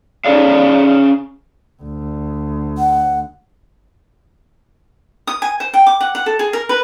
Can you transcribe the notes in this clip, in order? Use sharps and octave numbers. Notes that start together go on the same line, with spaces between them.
C#4 G#4 C#5 D5 F5
D2
F#5
D#6
G#5
C5
G5
D6
F#5
F#5
A4
G#4
A#4
B4